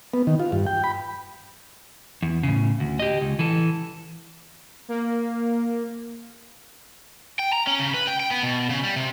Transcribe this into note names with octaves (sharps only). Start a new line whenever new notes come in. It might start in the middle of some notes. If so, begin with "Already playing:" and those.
B3
D#3
F4
G2
G5
B5
E2
A2 C#3
D2
G4 D#5
C#2
E3 A4
A#3
G5
A#5
C#4
C#3
B4
G5
G5
B3
B2
C#3
G3
C3